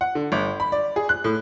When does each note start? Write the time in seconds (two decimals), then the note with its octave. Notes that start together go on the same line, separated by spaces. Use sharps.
0.01 F#5
0.15 D3
0.32 G1
0.60 B5
0.72 D5
0.96 G#4
1.09 F#6
1.24 A2